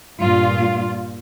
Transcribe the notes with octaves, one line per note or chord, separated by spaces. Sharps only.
G2 A#2 F4